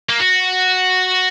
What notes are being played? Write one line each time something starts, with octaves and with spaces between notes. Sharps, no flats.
A#3
F#4